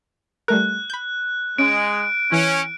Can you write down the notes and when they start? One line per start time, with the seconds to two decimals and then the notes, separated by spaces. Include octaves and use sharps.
0.48 G3 A3 A#4 F#6
0.90 B5 G6
1.58 G#3 C#4 D7
2.32 E3 C#4